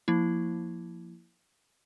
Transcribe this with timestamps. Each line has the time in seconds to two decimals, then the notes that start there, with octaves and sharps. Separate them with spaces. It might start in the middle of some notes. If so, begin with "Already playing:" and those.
0.08 F3 A#3 E4